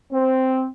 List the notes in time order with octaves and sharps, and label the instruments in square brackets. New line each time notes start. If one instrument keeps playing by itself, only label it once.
[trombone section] C4